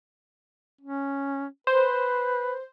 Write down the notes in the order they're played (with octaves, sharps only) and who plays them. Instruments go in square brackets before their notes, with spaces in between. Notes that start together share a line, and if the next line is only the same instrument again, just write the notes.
[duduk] C#4
[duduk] B4 [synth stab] C5